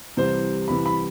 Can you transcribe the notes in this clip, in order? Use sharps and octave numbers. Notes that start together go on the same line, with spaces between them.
C2 C3 E3 G3 C5
C2 C3 E3 G3 B5
B5